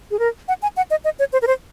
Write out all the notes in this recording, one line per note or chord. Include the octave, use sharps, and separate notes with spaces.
G#4
A#4
F#5
G#5
F#5
D#5
D#5
C#5
C5
A#4
C5